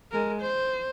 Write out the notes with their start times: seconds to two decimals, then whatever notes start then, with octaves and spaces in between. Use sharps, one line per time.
0.12 G#3 A#4
0.41 C5